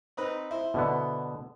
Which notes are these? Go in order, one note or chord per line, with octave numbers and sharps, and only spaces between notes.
C4 D#4 B4
E4 C5
B2 D3 B3